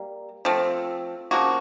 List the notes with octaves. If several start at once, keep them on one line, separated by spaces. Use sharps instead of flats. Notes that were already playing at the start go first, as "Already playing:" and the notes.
Already playing: G3 A#3
F3 A3 C4
C#3 F3 A#3 F#4